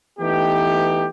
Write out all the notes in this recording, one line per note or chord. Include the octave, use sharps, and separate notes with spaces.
E3 A3 B3 D#4 G4